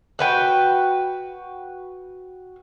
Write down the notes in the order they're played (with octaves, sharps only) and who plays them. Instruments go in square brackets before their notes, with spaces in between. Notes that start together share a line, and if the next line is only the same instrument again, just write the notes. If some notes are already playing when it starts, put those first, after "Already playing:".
[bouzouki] F#4 B4 G5